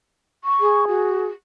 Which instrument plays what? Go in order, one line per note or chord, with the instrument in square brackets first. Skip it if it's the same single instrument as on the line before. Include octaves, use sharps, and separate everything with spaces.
[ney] C#6
[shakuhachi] G#4
[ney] F#4